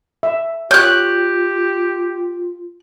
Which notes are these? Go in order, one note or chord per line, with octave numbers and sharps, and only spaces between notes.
E5
F4 G4 C#5 F#6 G6